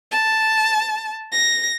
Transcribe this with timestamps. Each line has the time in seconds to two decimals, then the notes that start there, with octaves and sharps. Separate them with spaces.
0.12 A5
1.32 A#6